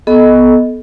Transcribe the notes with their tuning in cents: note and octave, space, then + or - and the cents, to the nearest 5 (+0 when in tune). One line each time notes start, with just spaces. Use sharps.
B3 +0 A4 -25 D#5 +0